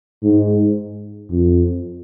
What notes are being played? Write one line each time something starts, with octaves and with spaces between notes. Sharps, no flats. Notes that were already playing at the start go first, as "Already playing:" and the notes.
G#2
F2